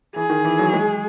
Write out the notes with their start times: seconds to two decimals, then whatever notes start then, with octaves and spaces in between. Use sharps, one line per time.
0.16 E3 G#4
0.30 D#3
0.45 E3
0.59 F#3
0.74 G#3